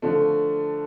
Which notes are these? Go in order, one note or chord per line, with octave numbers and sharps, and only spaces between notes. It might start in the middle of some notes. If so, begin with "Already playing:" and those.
D3 F3 A3